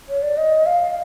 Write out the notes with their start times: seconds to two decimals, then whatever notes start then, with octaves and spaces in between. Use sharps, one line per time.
0.09 C#5
0.23 D5
0.37 D#5
0.66 F5